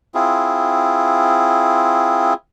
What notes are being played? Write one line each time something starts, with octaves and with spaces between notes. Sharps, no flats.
C4 E4 F4 G#4